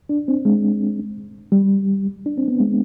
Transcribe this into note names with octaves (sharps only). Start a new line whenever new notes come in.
D4
C4
G#3
G3
D4
C4
B3
G#3